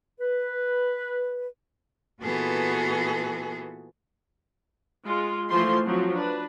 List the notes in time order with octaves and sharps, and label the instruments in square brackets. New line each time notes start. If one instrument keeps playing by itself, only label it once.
[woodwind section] B4
[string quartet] A#2 E3 B3 F#4 G#4 A4
[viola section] G#3 F4
E3 F3 A3 F4 C5 C6
F3 F#3 C4
D4 B4